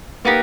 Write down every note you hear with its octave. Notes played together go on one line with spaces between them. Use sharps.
A#3 B3 D#4 G4